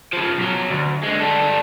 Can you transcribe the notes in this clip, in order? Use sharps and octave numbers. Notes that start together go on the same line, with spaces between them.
C#3 F3
B1 F#3
D2
D3 G#3
G3 A4